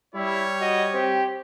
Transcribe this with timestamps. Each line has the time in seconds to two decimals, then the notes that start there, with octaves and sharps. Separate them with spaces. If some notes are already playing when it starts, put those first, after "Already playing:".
0.15 G3 E4 C#5
0.61 F#4 D#5
0.94 C4 G4